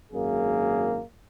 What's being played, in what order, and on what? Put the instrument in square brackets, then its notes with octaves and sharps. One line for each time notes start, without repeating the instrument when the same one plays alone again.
[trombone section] G#1 F#2 A#3 G#4